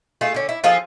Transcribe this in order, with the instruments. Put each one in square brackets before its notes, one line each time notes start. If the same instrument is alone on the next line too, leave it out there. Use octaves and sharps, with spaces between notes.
[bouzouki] A3 F4 G#4
D3 C#4
E4
F3 F4 G#4 A4